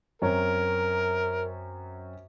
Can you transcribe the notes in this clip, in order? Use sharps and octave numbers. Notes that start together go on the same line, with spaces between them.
F#2 C4 A#4 C#5